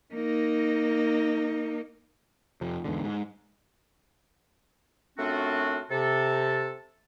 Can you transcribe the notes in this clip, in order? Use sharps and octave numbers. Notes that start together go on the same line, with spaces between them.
A#3 D#4
F2 C3
E2 G#2 D3
G#2
F#2 A3 C4 D4 F4 F#4
C3 A4